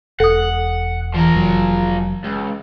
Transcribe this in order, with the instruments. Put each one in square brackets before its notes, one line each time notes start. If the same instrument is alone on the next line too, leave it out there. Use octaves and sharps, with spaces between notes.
[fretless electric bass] E1 [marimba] A4 D#6 [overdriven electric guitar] F#5
[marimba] E3 [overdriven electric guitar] F3 A#4
[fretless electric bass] F1 F#3
[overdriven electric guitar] C#2